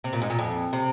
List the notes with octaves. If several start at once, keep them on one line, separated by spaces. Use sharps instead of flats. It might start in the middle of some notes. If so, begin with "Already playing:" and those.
C3
A#2
G#2
A#2
F2
C3